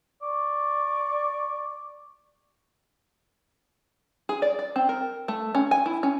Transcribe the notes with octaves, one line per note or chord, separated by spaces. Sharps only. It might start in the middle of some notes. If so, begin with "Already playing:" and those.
D5 C#6
G#4
D5
D5
C4
A#4
A3
C#4
G#5
E4
C#4